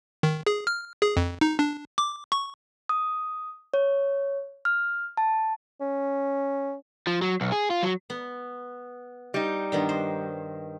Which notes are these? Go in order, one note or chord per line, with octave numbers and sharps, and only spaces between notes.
D#3
G#4
F6
G#4
F2
D#4
D4
D6
C#6
D#6
C#5
F6
A5
C#4
F3
F#3
B1
G#4
F4
F#3
B3
G3 D#4
G2 D#3 B3
C5